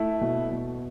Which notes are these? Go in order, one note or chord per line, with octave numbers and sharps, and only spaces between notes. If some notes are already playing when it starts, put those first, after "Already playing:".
Already playing: A3 E4 A4
B2
B2